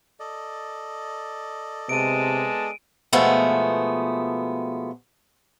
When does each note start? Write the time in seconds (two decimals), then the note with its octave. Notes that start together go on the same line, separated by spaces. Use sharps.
0.20 A4 D5 D#5
1.89 C3 G#3 B3 A5 D7 D#7
3.13 B2 F3 G#3 A3 B3